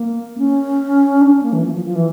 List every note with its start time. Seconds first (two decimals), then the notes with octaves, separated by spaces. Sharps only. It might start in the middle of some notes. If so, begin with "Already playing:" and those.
Already playing: A#3
0.38 C#4
1.21 D4
1.32 C#4
1.43 A#3
1.53 E3
1.63 F3
1.74 F3
1.85 F3
1.95 E3